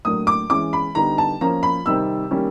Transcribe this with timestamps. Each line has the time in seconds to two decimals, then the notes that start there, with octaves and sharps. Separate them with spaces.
0.05 A2 F#3 A#3 D4 D#6
0.27 D6
0.50 E3 G#3 C#4 D6
0.73 B5
0.95 D3 G3 B3 D#4 A#5
1.18 A5
1.41 F3 A#3 C#4 A#5
1.63 B5
1.86 C3 D#3 G3 C4 D#4 E6
2.31 D#3 G3 A#3 C#4